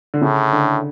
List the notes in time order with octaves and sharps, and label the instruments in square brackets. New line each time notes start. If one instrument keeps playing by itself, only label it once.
[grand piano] D3
[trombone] A2 [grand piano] C#3
[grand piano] D3